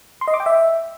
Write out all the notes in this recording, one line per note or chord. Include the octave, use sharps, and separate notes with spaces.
C6
D#5
D6
G5
E5